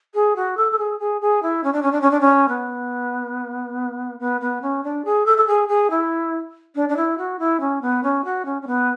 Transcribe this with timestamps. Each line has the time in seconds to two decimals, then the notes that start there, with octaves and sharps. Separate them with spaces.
0.14 G#4
0.36 F#4
0.57 A4
0.71 A4
0.78 G#4
0.99 G#4
1.21 G#4
1.42 E4
1.63 C#4
1.73 D4
1.82 C#4
1.92 D4
2.01 C#4
2.11 D4
2.20 C#4
2.48 B3
4.19 B3
4.41 B3
4.62 C#4
4.83 D4
5.05 G#4
5.26 A4
5.37 A4
5.47 G#4
5.68 G#4
5.90 E4
6.75 D4
6.89 D4
6.96 E4
7.18 F#4
7.39 E4
7.60 C#4
7.81 B3
8.03 C#4
8.24 F#4
8.45 C#4
8.62 C#4
8.67 B3